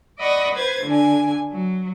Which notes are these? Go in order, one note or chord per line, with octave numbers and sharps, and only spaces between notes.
D5 D#5 F#5 B5 C#6 D#6
B4 C5 G#6 A6
D3 D4 G#5
F#3